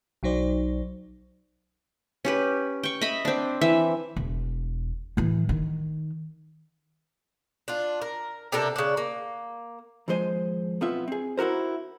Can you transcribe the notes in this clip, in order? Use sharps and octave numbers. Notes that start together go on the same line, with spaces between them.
B1 F#3 D#4 C5 D5
C#4 G4 B4
G5 C#6
D#5 E5 B5
C4 D4
E3 E5
E1
A2 E3
D#3
D4 F4
A#4
C3 D4 A4 A#4
C#3 D4
A#3
D#2 F3 G#3 C5 G#5
B1 B3 C4 F4 E5
C4 G#4
D#4 E4 F#4 A#4 C5